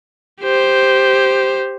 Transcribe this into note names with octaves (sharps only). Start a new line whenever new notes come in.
G4 C5